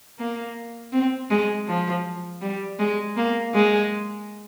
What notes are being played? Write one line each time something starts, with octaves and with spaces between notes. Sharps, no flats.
A#3
C4
G#3
F3
G3
G#3
A#3
G#3